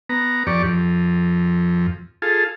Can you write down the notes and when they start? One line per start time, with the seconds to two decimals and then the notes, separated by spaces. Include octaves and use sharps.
0.09 B3 A#5
0.47 F2 G4 D5 C#6
0.65 F2
2.22 F4 G#4 A4